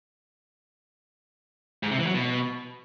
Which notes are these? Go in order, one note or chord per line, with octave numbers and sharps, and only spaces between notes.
G#2
C3
E3
F#3
B2